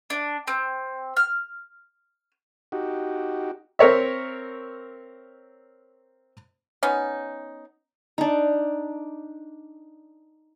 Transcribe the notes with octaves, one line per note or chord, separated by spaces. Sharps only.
D4
C4
F6
D#4 F#4 G4
C4 A#4 C#5 E5
B3 C#4 D#4
D4 D#4